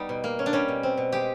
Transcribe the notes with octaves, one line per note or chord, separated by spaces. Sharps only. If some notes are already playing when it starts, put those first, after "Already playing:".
Already playing: G3 B3 D#4
B2
A#3
C#4
D4
G3 C#4
B2
C4
B2
G#3 G4